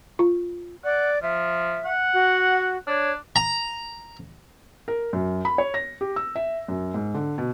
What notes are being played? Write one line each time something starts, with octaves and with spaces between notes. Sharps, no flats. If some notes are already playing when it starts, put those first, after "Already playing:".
F4
D5 F#5
F3 E5
F#5
F#4
D4 C#5
A#5
A#4
F#2
B5
C#5
A#6
G4
E6
E5
F#2
G#2
D3
B2